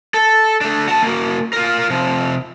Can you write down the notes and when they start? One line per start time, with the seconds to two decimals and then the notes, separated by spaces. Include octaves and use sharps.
0.14 A4
0.61 A3 D4
0.88 F#4 A5
1.02 A#3 F#4
1.53 F4 A#4
1.90 C3 F3